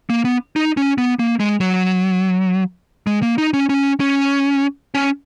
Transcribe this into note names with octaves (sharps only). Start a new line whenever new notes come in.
A#3
B3
D#4
C#4
B3
A#3
G#3
F#3
G#3
A#3
D#4
C#4
C#4
C#4
C#4